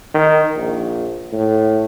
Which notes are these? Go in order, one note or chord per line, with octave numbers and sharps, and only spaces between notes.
D#3
A#1
A2